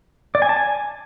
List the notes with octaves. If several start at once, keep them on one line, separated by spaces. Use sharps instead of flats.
D5
G#5
A5
G#5